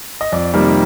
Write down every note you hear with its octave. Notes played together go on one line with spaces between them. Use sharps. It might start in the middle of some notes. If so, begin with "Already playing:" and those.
D#5
F2 D5
C3 D#3 G3 A#3